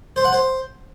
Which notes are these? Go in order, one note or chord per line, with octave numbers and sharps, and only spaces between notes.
C5
F#5
C5